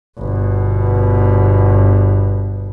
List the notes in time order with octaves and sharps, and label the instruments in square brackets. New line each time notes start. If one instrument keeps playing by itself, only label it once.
[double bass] G1 B2